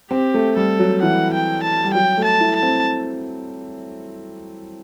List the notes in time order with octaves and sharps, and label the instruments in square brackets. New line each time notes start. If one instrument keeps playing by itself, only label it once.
[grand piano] C4 [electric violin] G4
[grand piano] A3
[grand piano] G3 [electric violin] A4
[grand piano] F#3
[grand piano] E3 [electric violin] F#5
[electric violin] G5
A5
[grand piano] G3
[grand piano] F#3 [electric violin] G5
[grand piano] A3
[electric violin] A5
[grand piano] E4
[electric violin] A5
[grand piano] C4